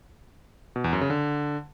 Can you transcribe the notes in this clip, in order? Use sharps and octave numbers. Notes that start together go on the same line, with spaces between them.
B2
E2
F#2
C#3
D3